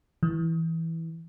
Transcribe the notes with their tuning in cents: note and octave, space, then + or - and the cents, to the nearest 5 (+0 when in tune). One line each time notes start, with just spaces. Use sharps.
E3 -10